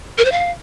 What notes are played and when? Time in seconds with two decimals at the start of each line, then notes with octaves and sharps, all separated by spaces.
0.18 A#4
0.25 C5
0.32 F5